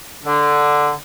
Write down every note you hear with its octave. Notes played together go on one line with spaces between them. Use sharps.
D3